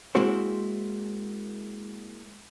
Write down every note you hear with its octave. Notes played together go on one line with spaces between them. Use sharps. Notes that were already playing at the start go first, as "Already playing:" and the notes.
G#3 A#3 C4 E4 F#4 C5